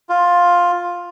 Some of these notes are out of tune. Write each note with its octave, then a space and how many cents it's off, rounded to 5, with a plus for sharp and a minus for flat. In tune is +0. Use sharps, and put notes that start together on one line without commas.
F4 +10